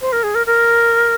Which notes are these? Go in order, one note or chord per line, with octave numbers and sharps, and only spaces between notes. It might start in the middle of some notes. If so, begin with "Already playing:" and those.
C5
A#4
G#4
A#4
A#4